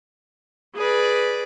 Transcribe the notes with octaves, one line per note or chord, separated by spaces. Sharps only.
G#4 B4 D5